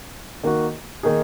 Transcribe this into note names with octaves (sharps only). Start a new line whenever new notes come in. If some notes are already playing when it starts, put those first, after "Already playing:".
D#3 A#3 D#4 F#4
D#3 A#3 D#4 G#4